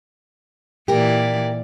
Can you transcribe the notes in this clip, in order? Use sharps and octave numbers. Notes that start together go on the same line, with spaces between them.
A#2 E3 G4 A#4 D5